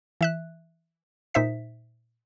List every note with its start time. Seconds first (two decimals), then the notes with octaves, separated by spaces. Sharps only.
0.21 E3 E5 F#6
1.34 A#2 D#4 C5 E5 B6